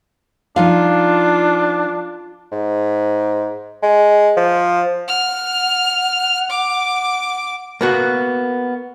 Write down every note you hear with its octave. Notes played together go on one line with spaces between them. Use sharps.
F3 D4 D#4 F4 F5
G#2
G#3
F3
F#5 F6
D6
A#3 B3 F#4